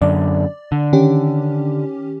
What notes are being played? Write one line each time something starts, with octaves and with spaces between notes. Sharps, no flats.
F#2 D3 D5
D3
D#3 C#4 G4